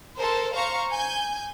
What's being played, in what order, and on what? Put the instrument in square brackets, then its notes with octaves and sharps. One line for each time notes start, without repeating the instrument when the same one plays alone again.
[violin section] A4 A#4 C5
C5 F5 A#5 C#6
G#5 G6